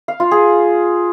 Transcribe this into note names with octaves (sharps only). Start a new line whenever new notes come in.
F5
F4
G#4